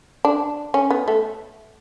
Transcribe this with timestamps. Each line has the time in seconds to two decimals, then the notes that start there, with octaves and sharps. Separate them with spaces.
0.25 D4
0.74 C#4
0.90 B3
1.08 A3